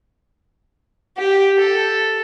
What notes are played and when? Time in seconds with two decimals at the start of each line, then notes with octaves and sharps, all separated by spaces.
1.18 G4
1.59 A4